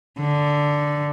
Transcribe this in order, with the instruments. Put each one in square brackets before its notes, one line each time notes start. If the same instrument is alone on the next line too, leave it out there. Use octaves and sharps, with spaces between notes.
[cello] D3